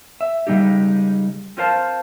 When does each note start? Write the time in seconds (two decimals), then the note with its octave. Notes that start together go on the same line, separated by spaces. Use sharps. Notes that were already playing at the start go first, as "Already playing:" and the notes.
0.21 E5
0.47 C#3 G3 G#3 D#4 G4
1.57 C4 F4 A#4 C5 F5 A5